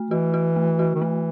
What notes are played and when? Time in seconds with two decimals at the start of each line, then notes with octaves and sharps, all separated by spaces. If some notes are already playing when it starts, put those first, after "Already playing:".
Already playing: A3
0.11 E3 F#4
0.34 F#4
0.56 A3
0.79 F#4
0.95 D#3
1.02 E3 A3